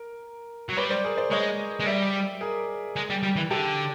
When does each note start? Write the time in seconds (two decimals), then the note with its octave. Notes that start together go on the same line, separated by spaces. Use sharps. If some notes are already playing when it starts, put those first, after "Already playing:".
Already playing: A#4
0.69 F#3
0.77 G3 B4 C#5
0.90 C5 D5
1.04 G#4 A#4
1.17 C5 D5
1.31 G#3 C#5 D#5
1.80 G#3
1.86 G3 D5 E5
2.41 G#4 A#4
2.96 G#3
3.10 G3
3.23 G3
3.36 E3
3.50 D3 G4 A4